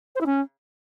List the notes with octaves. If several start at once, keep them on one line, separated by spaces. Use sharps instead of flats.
C5
E4
C#4